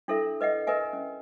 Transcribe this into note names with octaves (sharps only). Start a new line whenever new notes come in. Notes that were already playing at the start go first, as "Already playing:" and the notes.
D4 E4 A4 A#4 E5
B4 D#5 E5 F#5
A#4 B4 D#5 E5 G#5
C#4